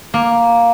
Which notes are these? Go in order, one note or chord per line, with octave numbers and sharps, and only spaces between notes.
A#3